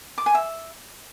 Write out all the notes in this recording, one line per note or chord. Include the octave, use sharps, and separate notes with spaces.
D6
G#5
E5